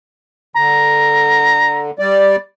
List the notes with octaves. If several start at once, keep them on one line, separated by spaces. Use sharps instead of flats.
D3 A#5
G3 D5